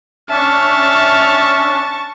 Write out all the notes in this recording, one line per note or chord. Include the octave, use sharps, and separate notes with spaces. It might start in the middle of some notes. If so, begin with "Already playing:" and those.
C#4 D4 E5 A5 C#6 F6